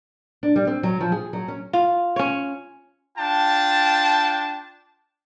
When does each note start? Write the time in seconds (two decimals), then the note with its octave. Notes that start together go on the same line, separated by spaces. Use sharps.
0.43 D4
0.56 G3
0.67 C4
0.83 F#3
1.01 F3
1.12 G#4
1.33 F#3
1.48 C#4
1.73 F4
2.16 C#4 C#5
3.18 D4 F4 G5 A5